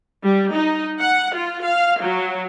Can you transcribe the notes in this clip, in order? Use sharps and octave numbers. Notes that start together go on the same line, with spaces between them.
G3
D#4
F#5
F4
F5
F#3